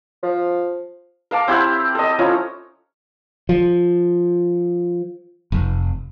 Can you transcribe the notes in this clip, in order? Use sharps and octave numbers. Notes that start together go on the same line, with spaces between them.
F3
A#4 F5 A5 D6
C4 E4 G4 F#5
A4 D#5
F3 C#4 E4 A#5
F3
F1